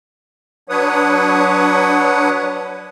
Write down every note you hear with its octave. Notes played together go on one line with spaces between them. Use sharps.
F#3 D4 B4 C#5 F#5 D#6